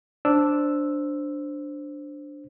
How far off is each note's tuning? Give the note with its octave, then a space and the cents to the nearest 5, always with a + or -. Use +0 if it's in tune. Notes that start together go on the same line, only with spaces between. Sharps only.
D4 +0 C5 +0 E6 +0